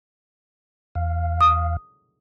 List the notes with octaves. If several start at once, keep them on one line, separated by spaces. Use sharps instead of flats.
E2 F5
D#6